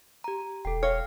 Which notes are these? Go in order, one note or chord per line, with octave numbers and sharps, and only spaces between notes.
G4 A#5
E1 A4 G5
C#5 F5 G5 F6